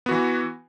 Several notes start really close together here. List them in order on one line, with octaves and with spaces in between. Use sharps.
B3 F#4 E3